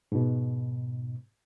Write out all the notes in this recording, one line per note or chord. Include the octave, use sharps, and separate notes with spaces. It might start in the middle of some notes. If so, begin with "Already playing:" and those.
G#2 B2